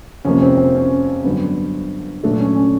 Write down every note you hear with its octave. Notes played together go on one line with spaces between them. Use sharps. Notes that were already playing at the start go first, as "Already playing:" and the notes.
F2 C3 F3 A#3 C#4
C4
C4
C#4
G2 D3 F#3 B3
A#2 F#3 A3 D4
C#4
C#4